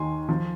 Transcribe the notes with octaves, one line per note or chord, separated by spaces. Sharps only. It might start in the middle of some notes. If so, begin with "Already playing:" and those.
Already playing: D#2 D#3 G#5 C6
F3